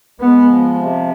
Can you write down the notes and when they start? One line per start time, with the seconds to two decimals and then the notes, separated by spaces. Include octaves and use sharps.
0.20 G#3 B3
0.46 F3
0.74 C3